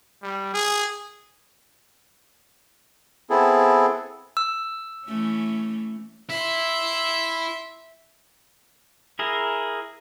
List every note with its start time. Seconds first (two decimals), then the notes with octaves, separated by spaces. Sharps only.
0.23 G3
0.54 G#4
3.30 B3 C4 E4 G#4 A4
4.37 E6
5.06 E3 A3 C#4
6.30 E4 E5 C6
9.19 E4 G#4 A#4